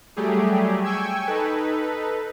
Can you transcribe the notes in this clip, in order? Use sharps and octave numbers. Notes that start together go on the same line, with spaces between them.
F#3 G3 A3 G4 G#4
G5 G#5 C#6 E6 G#6
D#4 A4 B4